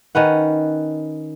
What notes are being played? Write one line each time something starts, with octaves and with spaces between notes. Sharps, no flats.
D#3 C#4 B4 F#5